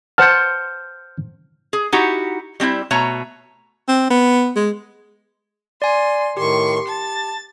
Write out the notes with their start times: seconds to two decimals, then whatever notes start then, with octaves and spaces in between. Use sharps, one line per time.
0.18 C5 F#5 A5 F6 G6
1.73 G#4
1.93 D#4 E4 F#4 G4
2.60 G3 C4 C#4 E4
2.91 B2 A3 C#5 A#5
3.89 C4
4.10 B3
4.56 G#3
5.82 D5 G#5 C6
6.37 A2 D#3 G4 C6 C#6
6.89 A5 A6